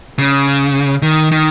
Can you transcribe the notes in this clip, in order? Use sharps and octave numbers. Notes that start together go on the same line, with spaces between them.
C#3
D#3
D#3